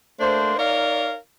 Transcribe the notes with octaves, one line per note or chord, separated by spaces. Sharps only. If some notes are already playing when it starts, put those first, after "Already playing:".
A3 A#3 D4 C5
D#4 A#4 C#5 D5 F5